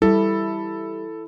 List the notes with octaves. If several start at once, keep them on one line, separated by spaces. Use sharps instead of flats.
G3 E4 A4